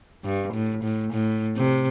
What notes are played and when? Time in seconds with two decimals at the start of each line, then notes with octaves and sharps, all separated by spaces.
0.24 G2
0.53 A2
0.83 A2
1.13 A2
1.57 C3